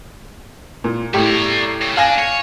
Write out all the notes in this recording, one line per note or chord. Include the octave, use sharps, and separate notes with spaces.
A#2
A2 G3 B3 G4
D5 A#5
C#3
D4 F5 G#5 A#6
C#5